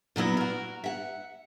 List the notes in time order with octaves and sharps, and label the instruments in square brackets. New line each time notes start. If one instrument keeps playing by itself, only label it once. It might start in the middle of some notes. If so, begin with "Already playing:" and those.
[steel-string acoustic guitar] A#2 F#3 B3 E4
F#4 A#4
E5 F#5